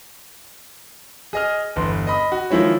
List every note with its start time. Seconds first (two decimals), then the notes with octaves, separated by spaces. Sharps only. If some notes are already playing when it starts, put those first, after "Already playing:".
1.33 G#4 D#5 F6
1.76 G1 E2 C6
2.07 D#5 B5 D#6
2.32 F#4
2.51 D#3 F3 G#3 E4 C#5